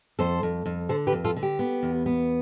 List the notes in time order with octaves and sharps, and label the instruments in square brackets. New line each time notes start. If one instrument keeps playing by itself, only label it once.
[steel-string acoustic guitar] F2 A4 C5
F2
F2
D3 A4 C5
G4 B4
F2
F4 A4
D3
G4
B3
E2
B3